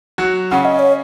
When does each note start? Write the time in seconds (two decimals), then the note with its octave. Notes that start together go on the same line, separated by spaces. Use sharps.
0.18 F#3 F#4
0.51 C#3 C#4 F#5
0.65 D#5
0.79 C#5